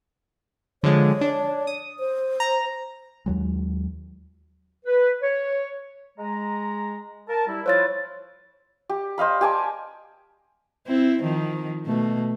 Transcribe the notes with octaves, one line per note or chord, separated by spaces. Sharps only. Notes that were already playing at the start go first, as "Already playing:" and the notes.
D3 F3 G#3 C#5
D4
D#6
C5
A#5
D#2 F#3 G#3
B4
C#5
G#3 A#5
A#4 A5
G3 E4
F3 E4 F4 C5 C#5 A6
G4
C5 D#5 F5 B5
G4 G#5 A5 D6
C4 E4
D#3 F3
B2 A3